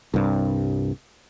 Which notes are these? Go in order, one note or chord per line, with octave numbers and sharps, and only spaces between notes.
C2 G2